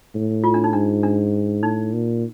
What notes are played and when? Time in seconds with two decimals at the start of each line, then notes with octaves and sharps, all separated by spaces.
0.15 A2
0.44 F4
0.54 D4
0.64 D#4
0.73 G#2 D4
1.03 D4
1.62 A2 D#4
1.93 A#2